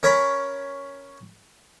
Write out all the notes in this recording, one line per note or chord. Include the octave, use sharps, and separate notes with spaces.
C#4 A#4 C#5 B5